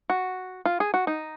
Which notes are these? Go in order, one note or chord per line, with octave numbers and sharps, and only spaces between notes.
F#4
F4
G#4
F#4
D#4